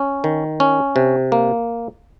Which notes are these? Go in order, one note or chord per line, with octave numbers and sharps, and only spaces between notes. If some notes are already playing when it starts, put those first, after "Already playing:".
Already playing: C#4
D#3
C#4
C3
A#3